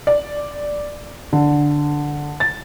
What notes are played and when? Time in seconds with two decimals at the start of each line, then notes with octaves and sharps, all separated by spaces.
0.07 D5
1.33 D3
2.40 A6